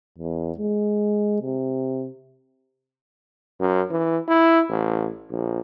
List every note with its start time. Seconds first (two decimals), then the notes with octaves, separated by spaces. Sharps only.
0.18 E2
0.58 G#3
1.41 C3
3.59 F#2
3.91 E3
4.28 E4
4.69 A1
5.30 A#1